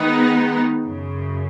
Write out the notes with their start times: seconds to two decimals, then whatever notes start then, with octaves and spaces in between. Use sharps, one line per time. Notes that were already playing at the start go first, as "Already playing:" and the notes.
Already playing: D#3 G#3 B3 D#4
0.84 F#2 C#3